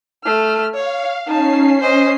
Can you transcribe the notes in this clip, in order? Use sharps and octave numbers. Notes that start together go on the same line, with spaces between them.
A3 F6
C#5 F5
C#4 D#4 A5 C7
C5 D#5